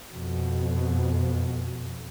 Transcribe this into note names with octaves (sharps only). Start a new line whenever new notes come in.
F2 B2